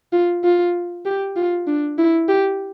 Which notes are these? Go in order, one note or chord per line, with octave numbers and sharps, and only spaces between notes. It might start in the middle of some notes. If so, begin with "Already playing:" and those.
F4
F4
G4
F4
D4
E4
G4